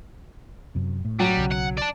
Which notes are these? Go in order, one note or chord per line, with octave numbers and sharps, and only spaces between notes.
F#2 C3
A2
F#3 G3
B1 C#3
F#5
D5 A5